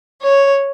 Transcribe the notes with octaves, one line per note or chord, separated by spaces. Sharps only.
C#5